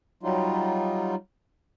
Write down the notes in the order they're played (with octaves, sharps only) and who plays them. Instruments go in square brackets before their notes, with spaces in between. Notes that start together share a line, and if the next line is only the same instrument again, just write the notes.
[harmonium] F#3 G3 D#4 F4